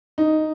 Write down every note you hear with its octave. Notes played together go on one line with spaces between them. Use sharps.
D#4